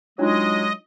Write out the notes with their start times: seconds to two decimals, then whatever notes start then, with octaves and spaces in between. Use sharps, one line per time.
0.19 F#3 G#3 D4 D#4 F4 D#5